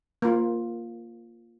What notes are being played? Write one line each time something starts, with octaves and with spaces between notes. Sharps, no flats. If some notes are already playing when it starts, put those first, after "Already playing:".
A#3 F4